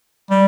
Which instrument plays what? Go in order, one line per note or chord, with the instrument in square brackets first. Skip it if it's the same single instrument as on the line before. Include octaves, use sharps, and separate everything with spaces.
[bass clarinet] G3